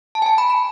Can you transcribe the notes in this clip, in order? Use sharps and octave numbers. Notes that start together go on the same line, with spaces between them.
A5
G#5
A5
B5
B5